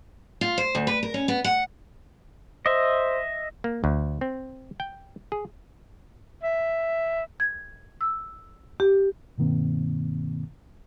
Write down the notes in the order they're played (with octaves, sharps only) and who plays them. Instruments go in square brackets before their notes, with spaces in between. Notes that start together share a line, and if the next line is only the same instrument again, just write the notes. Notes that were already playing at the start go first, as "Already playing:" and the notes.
[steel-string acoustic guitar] F4
C5
D2
B4
A#4
C#4
B3
F#5
[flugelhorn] C5 [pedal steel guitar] D#5 E5
[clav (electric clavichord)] A#3
D2
C4
G5
G#4
[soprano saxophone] E5
[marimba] G#6
E6
G4
[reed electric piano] G2 B2 D#3 A#3 C4